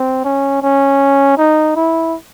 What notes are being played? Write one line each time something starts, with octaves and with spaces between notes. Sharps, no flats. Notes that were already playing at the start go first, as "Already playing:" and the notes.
Already playing: C4
C#4
C#4
D#4
E4